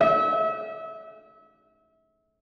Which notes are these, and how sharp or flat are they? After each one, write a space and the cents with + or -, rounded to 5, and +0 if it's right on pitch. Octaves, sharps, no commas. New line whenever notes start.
E5 -30